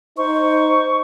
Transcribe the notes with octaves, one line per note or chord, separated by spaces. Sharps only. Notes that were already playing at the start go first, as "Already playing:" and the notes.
D#4 C5 C#6